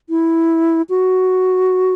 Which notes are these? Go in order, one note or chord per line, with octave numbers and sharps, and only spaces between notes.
E4
F#4